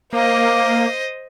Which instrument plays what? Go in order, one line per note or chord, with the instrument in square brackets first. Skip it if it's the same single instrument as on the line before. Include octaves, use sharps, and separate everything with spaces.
[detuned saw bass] A#3 [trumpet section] A#4 D6 [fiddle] C5 D#5 [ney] F5